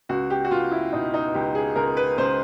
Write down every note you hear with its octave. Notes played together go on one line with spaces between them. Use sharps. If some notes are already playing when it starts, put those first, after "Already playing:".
C#2 F#4
G4
F#4
C#2 F4
E4
B2 D#4
D#4
C#2 G4
G#4
C#2 A#4
B4
C#2 C5